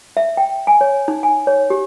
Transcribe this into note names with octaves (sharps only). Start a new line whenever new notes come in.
E5
G5
G#5
C#5
D#4
G#5
C#5
G4